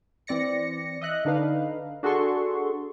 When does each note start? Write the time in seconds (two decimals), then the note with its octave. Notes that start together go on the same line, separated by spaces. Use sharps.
0.27 E3 C4 D5 A#6 C#7
1.01 D#5 E5 F#6
1.25 D3 D4 D#4 B4 F5
2.03 D4 F#4 G#4 A4 C6 C#6